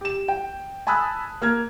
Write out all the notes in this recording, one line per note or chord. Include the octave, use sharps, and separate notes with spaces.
G4 E7
G5
G#5 A5 B5 D#6 E6 F#6
A#3 F6 G#6